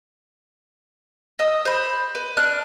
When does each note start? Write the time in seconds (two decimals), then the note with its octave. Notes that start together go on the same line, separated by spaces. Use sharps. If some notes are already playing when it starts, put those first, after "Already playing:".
1.39 D#5 D#6 E6
1.65 C5 B5
2.15 B4
2.37 D4 F6 F#6